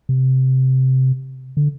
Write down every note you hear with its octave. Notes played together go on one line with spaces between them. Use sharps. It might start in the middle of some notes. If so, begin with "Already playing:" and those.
C3
D3